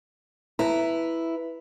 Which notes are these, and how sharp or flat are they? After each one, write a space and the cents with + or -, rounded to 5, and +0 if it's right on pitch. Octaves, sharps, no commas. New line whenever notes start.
E4 +0 B4 +0 A#5 +0